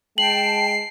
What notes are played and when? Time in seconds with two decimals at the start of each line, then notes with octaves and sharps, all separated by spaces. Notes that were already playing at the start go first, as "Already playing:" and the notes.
0.18 G#3 G5 A5 C7 F#7